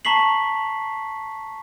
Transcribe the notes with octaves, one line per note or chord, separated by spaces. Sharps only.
A5 A#5 C#6 B6 C7 F#7